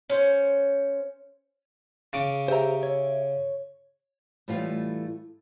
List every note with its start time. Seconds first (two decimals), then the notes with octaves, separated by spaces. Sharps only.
0.10 C#4 C5
2.13 C#3 D6
2.48 G4 G#4 C5 E5 A#5
2.83 C#5
4.48 A2 E3 G3 A3 F4